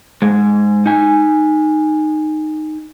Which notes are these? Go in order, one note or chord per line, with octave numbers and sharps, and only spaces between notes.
G#2 G#3
D#4 G#5